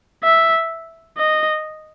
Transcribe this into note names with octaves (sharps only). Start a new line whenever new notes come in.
E5
D#5